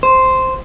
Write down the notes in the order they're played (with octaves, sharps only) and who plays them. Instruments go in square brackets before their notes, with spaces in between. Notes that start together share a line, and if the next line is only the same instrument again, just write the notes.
[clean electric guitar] C5